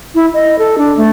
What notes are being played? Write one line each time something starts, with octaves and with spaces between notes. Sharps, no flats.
E4
D#5
A4
D4
A3